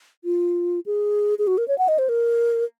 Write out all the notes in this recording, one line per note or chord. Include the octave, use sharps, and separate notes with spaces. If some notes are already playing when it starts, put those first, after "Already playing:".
F4
G#4
G#4
F#4
A#4
C#5
F#5
D#5
C5
A#4